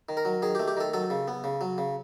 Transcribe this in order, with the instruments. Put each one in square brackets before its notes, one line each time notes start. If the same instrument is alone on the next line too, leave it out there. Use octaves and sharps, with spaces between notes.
[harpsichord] D#3
A#4
F#3
D#3 G#4
G4
A3
G4
D#3 A4
F#3 A4
C#3
B3
C#3
F#3
C#3